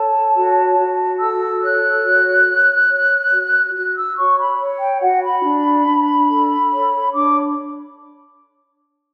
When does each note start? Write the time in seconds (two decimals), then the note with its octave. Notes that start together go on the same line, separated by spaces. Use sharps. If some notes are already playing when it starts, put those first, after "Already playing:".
Already playing: A4 C#5 A5
0.35 F#4
0.78 F#4
1.19 A4 E6
1.62 C#5 F#6
2.04 F#4
2.47 C#5
2.89 C#5
3.32 F#4
3.74 F#4 F#6
3.96 E6
4.16 C#5 C#6
4.38 B5
4.59 C#5
4.80 G5
5.01 F#4 F#5
5.23 B5
5.44 D4
5.86 D4
6.29 A4
6.71 C#5
7.14 D4 D6